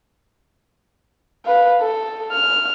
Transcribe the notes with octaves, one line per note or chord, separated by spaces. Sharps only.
B4 F5
A4
F6